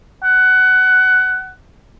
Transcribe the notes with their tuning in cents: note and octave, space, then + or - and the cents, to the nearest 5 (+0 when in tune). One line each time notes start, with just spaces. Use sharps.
F#5 +15